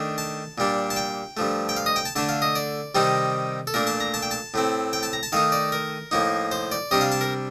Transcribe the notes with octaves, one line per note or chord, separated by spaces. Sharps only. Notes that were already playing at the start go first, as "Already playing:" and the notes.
Already playing: D#3 A3 D4
A5
A#2 G3 D4
A5
G5
G2 F3 A3
G5
F5
D#5
G5
A5
D3 A3 D4 A5
F5
D#5
D5
C3 D#3 G3 C4 D#4
A4
A#2 A3 D4 A#4
A5
A#5
A5
G5
A5
A2 A3 C4
G5
A5
A#5
A5
D#3 A3 D#4 F5
D5
A#4
A2 F3 A#3 D#4
C5
D5
C3 G3 D4 D#5
F5
A5
A#4